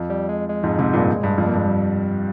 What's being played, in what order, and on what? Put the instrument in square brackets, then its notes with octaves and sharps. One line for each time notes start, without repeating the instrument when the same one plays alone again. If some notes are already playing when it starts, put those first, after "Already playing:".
Already playing: [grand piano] F2
[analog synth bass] G3
G#3
G#3
[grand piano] F2 G#2
G#2 C3
G2 A#2
G2
F2
[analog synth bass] A#3
[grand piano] G2 [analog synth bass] G#3
[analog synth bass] G3